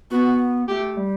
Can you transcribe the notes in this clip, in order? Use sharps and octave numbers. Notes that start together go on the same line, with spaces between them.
B3 F#4
A3 G4
G3